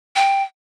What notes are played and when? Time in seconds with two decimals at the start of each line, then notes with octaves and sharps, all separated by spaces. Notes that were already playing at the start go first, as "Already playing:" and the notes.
0.16 G5